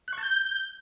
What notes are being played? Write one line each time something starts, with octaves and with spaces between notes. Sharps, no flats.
F#6
C#6
A5
G6